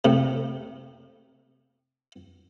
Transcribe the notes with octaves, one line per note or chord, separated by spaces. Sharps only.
A2 C3